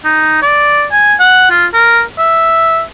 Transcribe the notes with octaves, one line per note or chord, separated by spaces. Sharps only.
D#4
D5
G#5
F#5
F4
A#4
E5